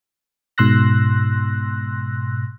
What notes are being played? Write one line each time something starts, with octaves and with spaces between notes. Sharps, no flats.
G#2 B2 C6 E6 F#6 A#6